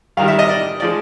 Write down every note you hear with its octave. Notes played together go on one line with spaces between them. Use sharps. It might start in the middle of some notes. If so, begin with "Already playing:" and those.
G2 D#3 G3 F5
E5
D#5
D5
F3 G#3 D5